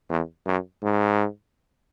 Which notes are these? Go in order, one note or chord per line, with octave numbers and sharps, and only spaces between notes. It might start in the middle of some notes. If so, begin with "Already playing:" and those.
E2
F#2
G#2